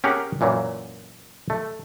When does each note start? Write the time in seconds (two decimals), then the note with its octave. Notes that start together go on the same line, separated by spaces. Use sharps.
0.04 C#4 G4 G#4 A#4 F#5
0.41 F#2 A#2 E3 F#3
1.50 A3